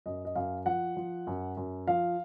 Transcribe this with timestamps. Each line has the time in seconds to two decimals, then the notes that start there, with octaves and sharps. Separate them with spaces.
0.06 F#2 D#5
0.25 D#5
0.35 F#2 F5
0.66 F3 F#5
0.97 F3
1.27 F#2
1.57 F#2
1.87 F3 F5